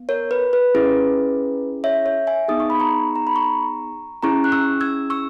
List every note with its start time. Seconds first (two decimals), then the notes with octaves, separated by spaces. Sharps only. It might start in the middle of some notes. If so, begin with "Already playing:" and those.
Already playing: B3
0.09 A#4 C#5
0.31 B4
0.53 B4
0.75 C#4 E4 G#4
1.84 C#5 E5
2.06 C#5 E5
2.27 E5 G#5
2.48 B3 D#4 G#4 D#6
2.60 C#6
2.70 B5
2.80 A#5 C#6
3.16 A#5
3.27 B5
3.36 A#5 C#6
4.23 C#4 E4 G#4 A#5 C#6
4.44 F#6
4.52 C#6 E6
4.81 E6 G#6
5.10 C#6 E6